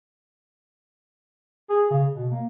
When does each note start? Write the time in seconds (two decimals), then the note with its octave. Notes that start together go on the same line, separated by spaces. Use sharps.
1.69 G#4
1.91 C#3
2.15 B2
2.31 A#3